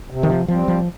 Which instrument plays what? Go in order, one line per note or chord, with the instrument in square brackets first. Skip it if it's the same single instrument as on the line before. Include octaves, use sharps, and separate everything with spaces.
[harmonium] C3
[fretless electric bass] D#3
F3
[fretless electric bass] F3 [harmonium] G3 C4
[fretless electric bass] F3